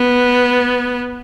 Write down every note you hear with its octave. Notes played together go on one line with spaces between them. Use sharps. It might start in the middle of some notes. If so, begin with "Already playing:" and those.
Already playing: B3